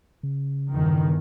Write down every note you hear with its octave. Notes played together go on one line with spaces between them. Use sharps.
C#3
G1 E2 D#3